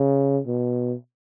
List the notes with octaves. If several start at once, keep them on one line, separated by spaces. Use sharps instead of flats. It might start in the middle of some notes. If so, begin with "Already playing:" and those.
Already playing: C#3
B2